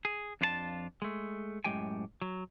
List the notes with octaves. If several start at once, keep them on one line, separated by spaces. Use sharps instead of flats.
G#4
F2 D4 F4 F#4 A5
G#3 A3
F#2 A2 G#3 G4 G5 G#5
F#3